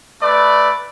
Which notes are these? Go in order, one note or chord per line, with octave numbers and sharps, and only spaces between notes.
A3 B4 D5